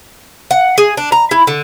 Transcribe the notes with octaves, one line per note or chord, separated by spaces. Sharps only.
F#5
G#4
D4
A#5
E4
D3